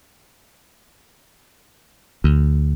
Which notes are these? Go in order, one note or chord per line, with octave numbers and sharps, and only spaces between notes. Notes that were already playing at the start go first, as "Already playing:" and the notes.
D2